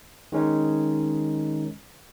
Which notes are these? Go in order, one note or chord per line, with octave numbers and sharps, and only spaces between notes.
D#3 G#3 C#4 D#4